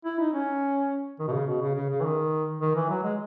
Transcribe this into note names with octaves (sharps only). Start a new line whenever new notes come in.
E4
D#4
C#4
D#3
B2
C#3
B2
C#3
C#3
C#3
E3
D#3
D#3
E3
F#3
G#3